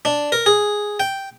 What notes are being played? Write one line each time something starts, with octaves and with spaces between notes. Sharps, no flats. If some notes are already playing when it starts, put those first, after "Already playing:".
D4
A#4
G#4
G5